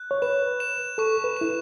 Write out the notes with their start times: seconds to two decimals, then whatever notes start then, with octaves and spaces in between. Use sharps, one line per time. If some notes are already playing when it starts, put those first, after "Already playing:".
Already playing: F#6
0.11 C#5
0.22 B4 E7
0.60 E7
0.98 A4 C#6
1.24 B4
1.37 E4 E7